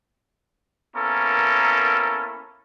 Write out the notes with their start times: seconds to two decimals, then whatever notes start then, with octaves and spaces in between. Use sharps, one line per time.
0.96 A#3 B3 C#4 E4 A4 A#4